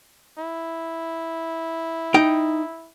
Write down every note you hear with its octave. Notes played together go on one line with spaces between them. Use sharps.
E4
D#4 G5